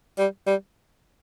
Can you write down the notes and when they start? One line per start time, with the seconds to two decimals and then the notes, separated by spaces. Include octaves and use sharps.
0.18 G3
0.47 G3